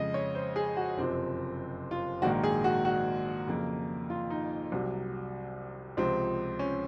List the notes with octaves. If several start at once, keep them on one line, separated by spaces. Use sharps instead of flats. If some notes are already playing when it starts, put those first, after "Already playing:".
Already playing: F2 C#3 G#3 D#5
C#5
C5
G#4
F#4
F#1 F2 C3 F3 C4
F4
A#1 G#2 D#3 A#3 F#4
G#4
F#4
F#4
F2 C#3 F#3 A#3
F4
D#4
C2 C3 F#3
C#2 C3 F3 C4
C#4